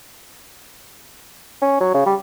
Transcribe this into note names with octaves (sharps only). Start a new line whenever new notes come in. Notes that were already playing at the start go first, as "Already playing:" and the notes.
C#4
F#3
C#3
G3